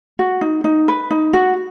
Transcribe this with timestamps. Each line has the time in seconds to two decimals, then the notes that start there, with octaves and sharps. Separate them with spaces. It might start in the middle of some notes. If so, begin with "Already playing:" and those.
0.19 F#4
0.41 D#4
0.64 D#4
0.88 B4
1.11 D#4
1.33 F#4